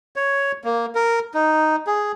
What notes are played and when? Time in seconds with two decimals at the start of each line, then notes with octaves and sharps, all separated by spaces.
0.16 C#5
0.64 A#3
0.95 A#4
1.34 D#4
1.87 G#4